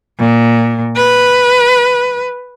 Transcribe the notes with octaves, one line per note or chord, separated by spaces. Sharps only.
A#2
B4